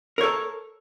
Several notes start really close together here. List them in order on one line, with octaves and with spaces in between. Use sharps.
A#4 C#5 A4